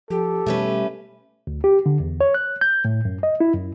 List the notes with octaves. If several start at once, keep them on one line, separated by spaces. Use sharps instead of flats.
F3 G4 A4
B2 G3 A3 C#4 B4 C#5
D2
G4
D3
E2
C#5
F#6
G6
A2
F#2
D#5
E4
F#2